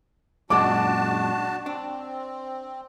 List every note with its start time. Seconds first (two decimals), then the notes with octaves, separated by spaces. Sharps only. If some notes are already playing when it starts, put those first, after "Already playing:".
0.50 F#2 A#2 G#3 D4 F#4 A5 D6
1.66 C4 D4